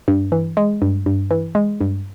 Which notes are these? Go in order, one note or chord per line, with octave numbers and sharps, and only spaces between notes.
G2
E3
G#3
G2
G2
E3
G#3
G2